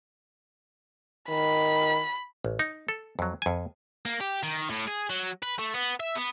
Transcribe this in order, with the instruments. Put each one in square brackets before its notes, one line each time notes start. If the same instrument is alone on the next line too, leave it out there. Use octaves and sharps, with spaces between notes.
[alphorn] D#3 [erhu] B5
[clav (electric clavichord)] A1
D#4
A4
F2 F#3
F2 G#5
[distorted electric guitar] A#3
G4
D#3
A2
G#4
F#3
B4
A3
B3
E5
B3